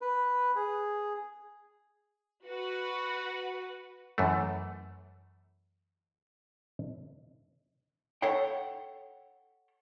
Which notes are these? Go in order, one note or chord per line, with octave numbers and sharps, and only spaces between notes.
B4
G#4
F#4 B4
F#2 E3 A3
A4 C#5 F#5 G5